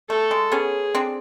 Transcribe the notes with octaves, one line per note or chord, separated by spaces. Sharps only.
A3 A4
G#3
B3 C#4 G#4
C4 D4